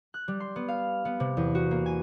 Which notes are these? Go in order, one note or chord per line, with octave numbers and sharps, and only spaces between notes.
F#6
G3
C6
B3
F5
B3
C3
E2
F#4
A#3
G#5